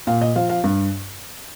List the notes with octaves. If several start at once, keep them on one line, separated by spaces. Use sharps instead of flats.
A#2 F5
D#5
F3 F5
F5
G2